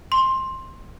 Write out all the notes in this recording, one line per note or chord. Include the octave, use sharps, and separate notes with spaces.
C6